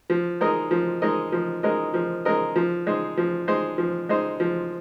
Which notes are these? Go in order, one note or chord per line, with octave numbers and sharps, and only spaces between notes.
F3
G#3 D#4 A#4 D#5
F3
G#3 D#4 A#4 D#5
F3
G#3 D#4 A#4 D#5
F3
G#3 D#4 A#4 D#5
F3
G#3 D#4 C5
F3
G#3 D#4 C5
F3
G#3 D#4 C5
F3